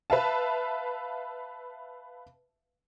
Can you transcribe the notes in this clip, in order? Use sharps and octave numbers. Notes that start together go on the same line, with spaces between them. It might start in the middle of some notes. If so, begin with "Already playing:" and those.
B4 E5 F5 A5